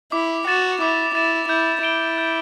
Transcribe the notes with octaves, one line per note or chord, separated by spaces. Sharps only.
E4 D6
F#4 A6 E7
E4 D6
E4 A6 E7
E4 G6
E4 D7 G7
G6